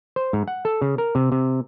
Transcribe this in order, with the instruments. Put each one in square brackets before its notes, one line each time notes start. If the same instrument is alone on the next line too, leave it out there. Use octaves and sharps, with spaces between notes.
[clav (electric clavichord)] C5
G#2
F#5
A4
C#3
A#4
C3
C3